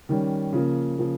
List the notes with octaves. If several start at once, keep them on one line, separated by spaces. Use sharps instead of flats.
D#3 G3 C#4
C#3 F3 A#3
C#3 F3 A#3